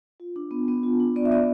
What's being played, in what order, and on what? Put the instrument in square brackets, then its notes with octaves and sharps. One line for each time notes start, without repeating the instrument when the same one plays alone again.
[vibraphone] F4
D4
B3
B3
F4
D4
B3 D5
E5
B3 D5